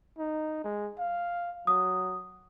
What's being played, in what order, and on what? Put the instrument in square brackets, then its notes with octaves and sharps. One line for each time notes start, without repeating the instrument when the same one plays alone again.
[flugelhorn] D#4
G#3
F5
[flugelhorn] F#3 [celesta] D#6